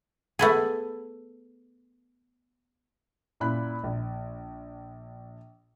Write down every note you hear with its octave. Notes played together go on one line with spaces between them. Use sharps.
A3 B3 G#4
F#2 A#2 E4 B5 F#6
A#1